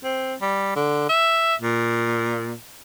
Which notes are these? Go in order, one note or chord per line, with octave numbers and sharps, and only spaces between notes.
C4
G3
D3
E5
A#2